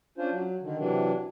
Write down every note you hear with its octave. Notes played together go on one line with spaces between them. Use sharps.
C#4 D4 F4 C5
F#3
D3 D#3
C3 E3 F#3 D4